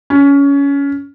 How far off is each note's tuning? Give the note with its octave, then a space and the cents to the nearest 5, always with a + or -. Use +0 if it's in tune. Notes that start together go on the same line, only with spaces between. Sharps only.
C#4 +20